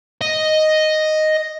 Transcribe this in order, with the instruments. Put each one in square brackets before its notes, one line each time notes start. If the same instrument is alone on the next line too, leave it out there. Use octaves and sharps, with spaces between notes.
[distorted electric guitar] D#5